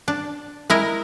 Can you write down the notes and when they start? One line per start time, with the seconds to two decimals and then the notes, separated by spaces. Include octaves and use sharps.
0.08 D4
0.70 G#3 E4 A#4